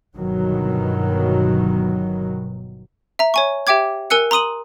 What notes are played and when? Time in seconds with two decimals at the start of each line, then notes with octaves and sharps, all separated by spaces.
0.16 G1 B2 D#3 F#3
3.19 E5 A#5
3.34 C#5 G#5 C#6
3.67 G4 E5 G5 D6 G#6
4.10 A#4 G#5 E6 F#6 C#7
4.31 A#5 C6 D#6 D#7 F#7